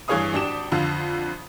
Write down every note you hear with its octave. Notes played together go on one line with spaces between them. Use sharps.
G2 E3 G#4 C#5 F5 D#6
G#1 D4 G4 E7
F2 D3 F5